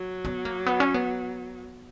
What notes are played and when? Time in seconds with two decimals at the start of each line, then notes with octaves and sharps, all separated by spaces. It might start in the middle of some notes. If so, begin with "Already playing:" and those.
Already playing: F#3
0.25 B3
0.45 A#3
0.66 B3
0.80 C#4
0.94 B3